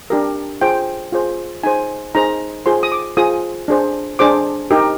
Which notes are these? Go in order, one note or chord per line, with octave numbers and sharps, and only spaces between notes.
D4 G4 A#4
F4 G#4 C5 G5
F4 G#4 C5
D#4 G#4 C5 G#5
D#4 G#4 C5 A#5
F4 G#4 C5 C6
D#6
D6
F4 G#4 C5 D#6
D4 G#4 C5
D4 G#4 C5 D6
D#4 G4 A#4